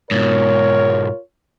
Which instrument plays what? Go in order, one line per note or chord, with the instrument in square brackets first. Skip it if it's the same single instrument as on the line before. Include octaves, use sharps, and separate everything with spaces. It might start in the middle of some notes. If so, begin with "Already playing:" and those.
[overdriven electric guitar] G#2 B2 [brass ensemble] F4 A#4 C#5